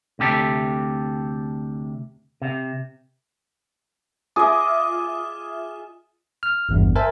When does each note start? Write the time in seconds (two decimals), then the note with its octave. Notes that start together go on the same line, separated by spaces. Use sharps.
0.19 D2 C3 G4 A4
2.42 C3
4.36 F4 G#4 D#5 E5 D6 D#6
6.43 F6
6.69 G#1 E2 G2
6.96 A#4 C5 E5 G#5 A5